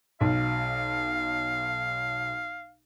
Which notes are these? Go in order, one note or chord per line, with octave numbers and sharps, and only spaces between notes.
B1 F5